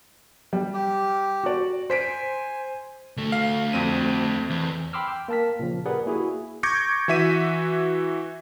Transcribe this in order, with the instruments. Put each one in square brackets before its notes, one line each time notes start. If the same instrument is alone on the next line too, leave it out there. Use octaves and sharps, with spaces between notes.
[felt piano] G3
[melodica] G4
[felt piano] F#4 D5
[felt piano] C5 B6 D7 [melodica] G#5
[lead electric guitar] D2 A3
[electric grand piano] F5
F2 C4 D#7
[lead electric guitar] E2
[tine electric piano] G5 B5 C6 D6 E6 F6
G5
A#3 A#4 A5 F6 B6
A#2 C#3 F3
G4 G#4 A#4 B4 D5 F#5
A#3 E4 F#4 G#4
[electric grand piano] C#6 D6 G6 G#6 A#6 C#7
E3 F#4 E5 B6 D#7